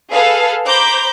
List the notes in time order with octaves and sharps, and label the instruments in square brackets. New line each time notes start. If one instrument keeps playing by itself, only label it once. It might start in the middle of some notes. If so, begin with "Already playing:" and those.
[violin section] G#4 A4 B4 F5
C5 A#5 B5 D6 G6